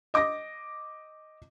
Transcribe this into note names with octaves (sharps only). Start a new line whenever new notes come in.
D#5 D6 D#6 A#6